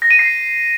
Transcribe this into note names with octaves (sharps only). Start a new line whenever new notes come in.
A#6
D#7
C7